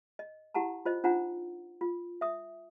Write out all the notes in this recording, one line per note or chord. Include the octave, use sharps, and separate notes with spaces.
D#5
E4 G4 F#5 A5 A#5
F4 C5 D#5
D4 D#4 F4 C5 F#5 A#5
F4
E5 D#6